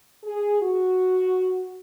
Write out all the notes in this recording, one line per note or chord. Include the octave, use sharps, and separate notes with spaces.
G#4
F#4